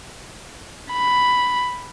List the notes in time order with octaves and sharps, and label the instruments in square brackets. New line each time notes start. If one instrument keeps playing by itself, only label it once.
[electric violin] B5